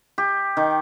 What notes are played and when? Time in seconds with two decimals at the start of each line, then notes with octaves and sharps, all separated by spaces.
0.18 G4
0.57 D#3